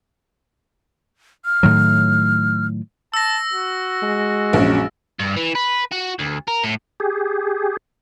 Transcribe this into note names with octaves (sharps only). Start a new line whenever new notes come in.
F6
A2 D#3 F#3
A5 E6 A#6
F#4
G#3
A#1 F#2
G2
E3
B4
F#4
D2
A#4
A2
G4 G#4